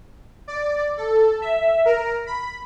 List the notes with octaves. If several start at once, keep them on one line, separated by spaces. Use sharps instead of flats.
D5
A4
E5
A#4
B5